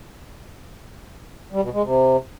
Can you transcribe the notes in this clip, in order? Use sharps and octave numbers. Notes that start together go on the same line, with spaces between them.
G3
B2
G#3
C3